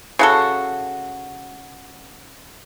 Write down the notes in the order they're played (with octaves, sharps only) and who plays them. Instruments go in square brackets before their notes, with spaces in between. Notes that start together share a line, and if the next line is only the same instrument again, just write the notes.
[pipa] C#3 F#4 A4